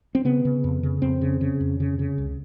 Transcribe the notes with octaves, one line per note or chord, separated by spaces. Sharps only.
C4
C#3 B3
C#3
F2
C#3
F2 C4
C#3
C#3
F2
C#3
C#3
C#2